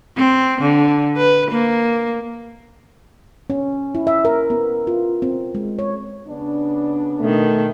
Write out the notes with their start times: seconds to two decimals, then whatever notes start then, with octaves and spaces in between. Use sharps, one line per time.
0.17 C4
0.61 D3
1.16 B4
1.51 A#3
3.50 C#4
3.95 E4
4.07 E5
4.25 A#4
4.50 B3
4.87 F4
5.22 C4
5.55 G#3
5.79 C#5
6.27 C#3 B3 D4
7.20 B2 D#3 A3